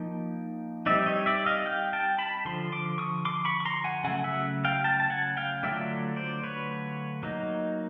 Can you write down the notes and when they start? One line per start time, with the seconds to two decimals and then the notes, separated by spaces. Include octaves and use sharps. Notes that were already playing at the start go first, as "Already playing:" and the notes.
Already playing: F3 A#3 D#4 G5
0.86 G3 C4 D#4 D5 E5
1.06 C#5 D#5
1.26 D5 E5
1.46 D#5 F5
1.66 F5 G5
1.93 G5 A5
2.19 A5 B5
2.45 D3 F3 C6
2.72 C6 D6
2.98 C#6 D#6
3.25 C6 D6
3.45 B5 C#6
3.60 C#6
3.65 A#5 C6
3.84 F#5 G#5
4.04 C#3 F#3 A3 F#5 G#5
4.24 E5 F#5
4.65 F5 G5
4.84 G5 A5
5.00 A5
5.10 F#5 G#5
5.37 F5 G5
5.63 D3 F#3 A3 D4 F4 D5 E5
6.16 C5 D5
6.43 B4 C#5
7.23 F#3 A#3 D#4